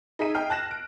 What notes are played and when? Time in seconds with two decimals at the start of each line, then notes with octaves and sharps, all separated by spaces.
0.19 D#4 G#4 E5 B6 D#7
0.34 D#5 G5 F6 C7
0.50 A5 F#6 A#6 E7
0.71 D7